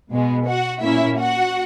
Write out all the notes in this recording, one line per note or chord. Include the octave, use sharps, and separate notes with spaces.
B2 G#3 B3
F#4 F#5
A#2 A#3 C#4 E4 E5
F#4 F#5